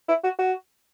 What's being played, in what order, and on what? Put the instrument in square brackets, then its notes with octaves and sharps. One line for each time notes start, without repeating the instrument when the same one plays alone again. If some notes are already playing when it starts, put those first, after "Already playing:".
[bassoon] E4
F#4
F#4